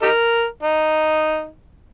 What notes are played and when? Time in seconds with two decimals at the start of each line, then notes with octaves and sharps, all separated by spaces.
0.02 D#4 G4 A#4
0.63 D#4